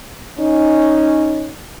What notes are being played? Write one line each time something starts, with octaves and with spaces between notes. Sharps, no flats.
C#4 D#4